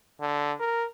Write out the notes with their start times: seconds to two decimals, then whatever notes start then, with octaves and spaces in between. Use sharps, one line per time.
0.20 D3
0.60 A#4